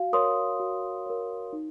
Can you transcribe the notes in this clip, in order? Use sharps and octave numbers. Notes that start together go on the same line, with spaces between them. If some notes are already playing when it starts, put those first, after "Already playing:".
Already playing: F#4 F5
A#4 C#5 C6 D#6
F#4
A#4 C#5
D#4